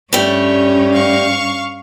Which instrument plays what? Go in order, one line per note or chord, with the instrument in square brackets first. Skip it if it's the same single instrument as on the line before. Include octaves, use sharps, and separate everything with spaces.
[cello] G2 C#4 [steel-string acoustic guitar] G3 A3 [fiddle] C#5
[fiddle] F5 C#6